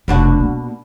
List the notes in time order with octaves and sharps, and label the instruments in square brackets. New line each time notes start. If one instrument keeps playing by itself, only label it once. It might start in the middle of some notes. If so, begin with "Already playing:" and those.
[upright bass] F1 [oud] B2 D4 F#4
[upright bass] A#3